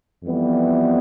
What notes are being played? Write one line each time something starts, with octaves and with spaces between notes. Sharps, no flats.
F2 E3 G3 B3